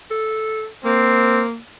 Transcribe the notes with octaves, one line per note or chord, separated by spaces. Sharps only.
A4
A#3 C4